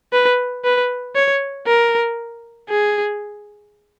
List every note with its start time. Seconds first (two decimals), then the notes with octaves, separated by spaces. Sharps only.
0.13 B4
0.64 B4
1.15 C#5
1.67 A#4
2.70 G#4